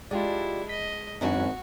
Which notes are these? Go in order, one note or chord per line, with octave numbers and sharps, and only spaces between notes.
G#3 D4 E4 F4 G4 D5
D#5 B6
G#1 F#2 C#4 D4 F#4